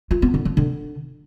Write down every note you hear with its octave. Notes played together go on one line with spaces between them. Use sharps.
F4
B3
D3
F3
D3